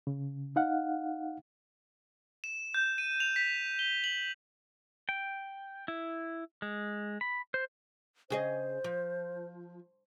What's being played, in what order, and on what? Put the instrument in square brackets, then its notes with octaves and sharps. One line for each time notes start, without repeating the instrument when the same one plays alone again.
[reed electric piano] C#3
D#4 F5 F#5
[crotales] E7
G6
D#7
F7
B6
G7
F#7
[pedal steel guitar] G5
E4
G#3
B5
C5
[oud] C#3 G#4 D#5 [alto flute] C5
[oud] F3